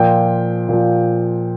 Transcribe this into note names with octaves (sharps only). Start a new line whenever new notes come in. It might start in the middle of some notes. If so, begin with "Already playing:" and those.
Already playing: A#2 F3 G5
A#2 F3